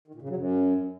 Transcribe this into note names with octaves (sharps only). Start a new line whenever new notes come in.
D#3
A#2
C#3
F#3
F#2